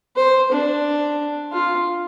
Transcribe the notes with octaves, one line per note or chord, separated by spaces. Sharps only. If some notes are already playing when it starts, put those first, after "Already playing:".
C5
D4
F4